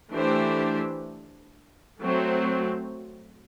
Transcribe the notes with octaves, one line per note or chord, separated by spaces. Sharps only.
E3 A3 D4 G4 C5
F#3 A3 C4